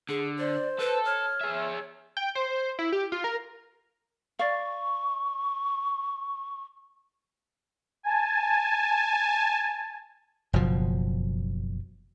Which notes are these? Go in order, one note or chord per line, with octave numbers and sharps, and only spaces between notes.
D3 G#4
C5 D5
A4 B4
C#5 F6
G#4 E5
G5
C5
E4
G4
F4
A#4
D5 F5 C#6
G#5 A5
F#1 B2 F3